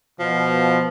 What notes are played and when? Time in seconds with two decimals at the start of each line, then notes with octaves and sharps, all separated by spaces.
0.20 B2 F3